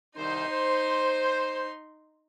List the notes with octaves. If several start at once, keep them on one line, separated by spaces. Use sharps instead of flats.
C2 D#3 D#4 C5 C6
C5